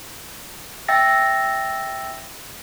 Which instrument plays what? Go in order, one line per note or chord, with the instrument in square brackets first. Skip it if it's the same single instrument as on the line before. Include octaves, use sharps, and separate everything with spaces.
[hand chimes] E5 G5 E6 A6 A#6